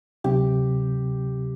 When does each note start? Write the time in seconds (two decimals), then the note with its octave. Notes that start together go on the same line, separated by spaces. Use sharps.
0.24 D2 C3 F#3 C4 G4